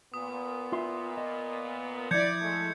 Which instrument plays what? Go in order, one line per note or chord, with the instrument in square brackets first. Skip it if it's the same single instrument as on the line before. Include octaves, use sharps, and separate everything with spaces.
[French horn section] A#2 B3 [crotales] D#6
[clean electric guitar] F4 E5 C6
D#5
[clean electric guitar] F3 E4 [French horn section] D5 [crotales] G6 G#6 C#7
[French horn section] G#3 A3